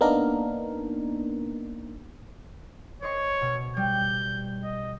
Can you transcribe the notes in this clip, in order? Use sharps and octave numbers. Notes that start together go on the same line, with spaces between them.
A#3 B3 D4 D#4 A#4
C5 C#5 D#5 C#6
B2
G3 G6
D#5